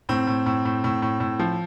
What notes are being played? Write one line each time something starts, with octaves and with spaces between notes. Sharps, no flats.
A2 C4
A2
A2
A2
A2
A2
A2
F3